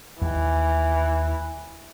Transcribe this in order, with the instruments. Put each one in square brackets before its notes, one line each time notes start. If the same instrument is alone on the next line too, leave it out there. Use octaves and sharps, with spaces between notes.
[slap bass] D#2 [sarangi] E3